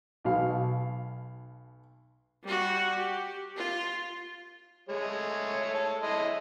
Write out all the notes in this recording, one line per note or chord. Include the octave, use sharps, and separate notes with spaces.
B1 B2 F5
G3 F#4
G4
F4
G#3 A3 C#5
A4 C#5
E4 D#5 C6